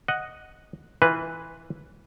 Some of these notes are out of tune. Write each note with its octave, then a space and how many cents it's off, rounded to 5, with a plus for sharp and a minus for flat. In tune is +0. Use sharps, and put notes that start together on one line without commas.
D#5 +0 F#5 +0
E3 -10 F4 +0 B4 +0